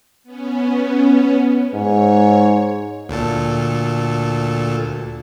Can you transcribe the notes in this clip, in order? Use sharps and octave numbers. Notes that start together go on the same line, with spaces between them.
B3 C#4
G#2 C#5
D2 A#2 A4